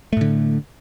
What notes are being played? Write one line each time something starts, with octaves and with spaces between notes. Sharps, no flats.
A2 D3 A3